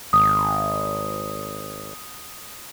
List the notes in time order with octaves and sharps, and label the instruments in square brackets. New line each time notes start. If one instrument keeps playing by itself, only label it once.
[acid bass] G#1 [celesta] D#6